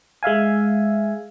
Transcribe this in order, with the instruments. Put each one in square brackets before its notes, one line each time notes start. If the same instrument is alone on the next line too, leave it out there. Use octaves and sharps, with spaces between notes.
[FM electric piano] G#3 E5 F5 G#5